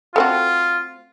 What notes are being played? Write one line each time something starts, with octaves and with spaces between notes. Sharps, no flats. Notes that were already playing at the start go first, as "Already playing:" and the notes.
A3 C4 F4 F#4